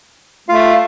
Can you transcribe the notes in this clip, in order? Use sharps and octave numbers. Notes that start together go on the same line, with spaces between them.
A3 F4 F5